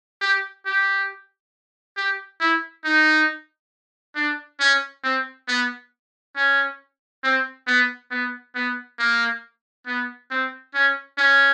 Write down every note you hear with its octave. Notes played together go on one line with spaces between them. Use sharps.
G4
G4
G4
E4
D#4
D4
C#4
C4
B3
C#4
C4
B3
B3
B3
A#3
B3
C4
C#4
C#4